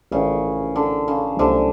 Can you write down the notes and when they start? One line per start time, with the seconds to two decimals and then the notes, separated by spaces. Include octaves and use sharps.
0.11 A#1 A2 C#3 E3 A3
0.76 D3
1.08 C#3
1.39 C2 B2 D3 F#3 A3